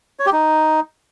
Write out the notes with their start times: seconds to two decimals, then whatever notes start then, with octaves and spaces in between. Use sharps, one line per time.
0.19 C#5
0.26 G4
0.33 D#4